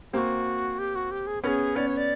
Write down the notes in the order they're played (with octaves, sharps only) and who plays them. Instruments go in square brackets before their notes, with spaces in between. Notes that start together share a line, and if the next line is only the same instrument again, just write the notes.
[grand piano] A#3 C4 [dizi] F#4 G4
[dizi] G4
F#4
G4
G#4
[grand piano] B3 C#4 [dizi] G#4 A#4
[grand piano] B3 C#4 [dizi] D5
[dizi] C#5
D5